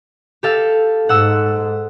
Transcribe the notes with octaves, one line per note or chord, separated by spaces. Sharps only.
G4 A4 F5
G#2 F#5 E6